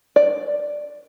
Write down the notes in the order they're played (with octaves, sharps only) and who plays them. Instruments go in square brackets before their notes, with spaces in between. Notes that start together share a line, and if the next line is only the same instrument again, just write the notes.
[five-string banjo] D5